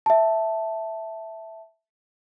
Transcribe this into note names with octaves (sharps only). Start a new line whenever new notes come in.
E5 A5